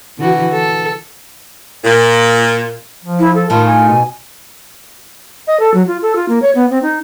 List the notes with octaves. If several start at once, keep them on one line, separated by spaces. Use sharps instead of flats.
D3 E3 F#4
A4
A#2
F3
E4
A4
A2 D#3 F4 A5
G#5
B2
D#5
A4
F#3
F4
A4
F4
A#3
C#5
B3
C4
D#4